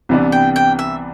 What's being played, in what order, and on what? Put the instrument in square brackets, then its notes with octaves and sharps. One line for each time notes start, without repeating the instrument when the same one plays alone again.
[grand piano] C2 C3 E3 B3 D4
[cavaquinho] G5
G5
E5